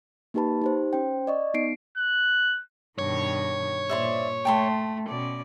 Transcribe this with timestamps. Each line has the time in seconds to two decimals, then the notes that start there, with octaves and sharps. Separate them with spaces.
0.34 A#3 D#4 G4 B4 A5 B5
0.62 D#4 G4 C5
0.93 C#4 C5 G5
1.27 D5 D#5 C#6
1.54 B3 D#4 C7 D7
1.97 F#6
2.99 G2 B2 D#3 C#5
3.89 A#2 C5 D5 E5
4.45 A3 G5 A5 C6
5.08 B2 C#4 D5